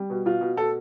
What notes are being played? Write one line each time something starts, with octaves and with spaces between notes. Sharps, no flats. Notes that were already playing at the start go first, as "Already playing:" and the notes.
Already playing: G3
B2
B2 F4
B2
B2 A4